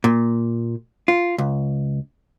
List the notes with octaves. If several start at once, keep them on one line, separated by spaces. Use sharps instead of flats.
A#2
F4
C#2